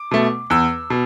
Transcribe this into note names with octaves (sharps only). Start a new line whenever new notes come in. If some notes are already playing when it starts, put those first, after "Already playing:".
Already playing: D6
B2 A3
E2 E6
B2